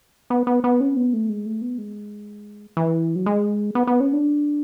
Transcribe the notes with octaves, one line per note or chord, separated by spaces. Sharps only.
B3
B3
B3
C#4
B3
A3
G#3
A3
B3
G#3
E3
F#3
G#3
B3
B3
C#4
D4